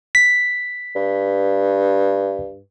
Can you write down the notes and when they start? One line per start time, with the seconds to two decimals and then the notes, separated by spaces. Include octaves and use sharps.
0.15 B6
0.96 G2